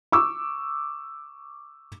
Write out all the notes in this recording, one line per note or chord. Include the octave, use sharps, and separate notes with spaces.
C#6 D6 E6